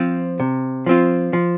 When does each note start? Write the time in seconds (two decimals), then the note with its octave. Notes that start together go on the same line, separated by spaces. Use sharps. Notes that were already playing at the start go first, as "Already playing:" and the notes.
Already playing: F3 C4 F4
0.40 C3
0.86 F3 C4 F4
1.33 F3